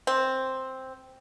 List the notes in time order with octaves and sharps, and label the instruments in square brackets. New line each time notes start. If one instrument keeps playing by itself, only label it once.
[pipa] C4